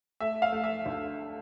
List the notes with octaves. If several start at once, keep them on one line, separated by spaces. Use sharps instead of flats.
A3 E5
F5
A3
E5
D2